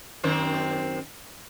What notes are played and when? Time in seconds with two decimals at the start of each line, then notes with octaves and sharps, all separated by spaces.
0.24 F#2 D#3 C4